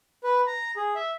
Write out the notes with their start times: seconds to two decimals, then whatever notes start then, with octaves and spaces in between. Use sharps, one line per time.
0.24 B4
0.47 A#5
0.77 G#4
0.95 E5